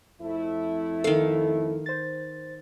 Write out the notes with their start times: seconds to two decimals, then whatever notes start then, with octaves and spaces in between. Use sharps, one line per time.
0.21 F2 A3 E4
1.04 D#3 A4 F5
1.86 C5 A6